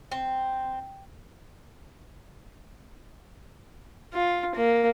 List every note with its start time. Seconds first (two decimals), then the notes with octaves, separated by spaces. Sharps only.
0.11 C4
4.14 F4
4.55 A#3